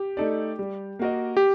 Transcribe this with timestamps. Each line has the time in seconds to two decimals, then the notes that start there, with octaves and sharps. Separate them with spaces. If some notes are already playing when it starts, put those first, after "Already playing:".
Already playing: G4
0.17 A3 D#4 A4 D5
0.59 G3
0.99 A#3 F#4 A#4 D#5
1.37 G4